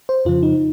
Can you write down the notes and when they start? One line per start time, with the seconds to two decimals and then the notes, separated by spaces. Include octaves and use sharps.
0.09 C5
0.25 F2 C#3 F3 F4
0.43 D#4